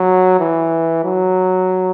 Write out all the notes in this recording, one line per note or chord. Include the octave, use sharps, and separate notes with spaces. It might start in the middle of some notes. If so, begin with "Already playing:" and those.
Already playing: F#3
E3
F#3